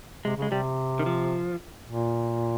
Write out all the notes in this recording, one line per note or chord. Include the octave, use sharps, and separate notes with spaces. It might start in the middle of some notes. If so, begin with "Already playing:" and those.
C3 G#3
C#3
G#3
C3 G3
D#3
F3
A#2